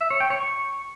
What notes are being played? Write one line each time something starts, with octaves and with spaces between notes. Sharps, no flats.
E5
C#5
G5
C#5
C#6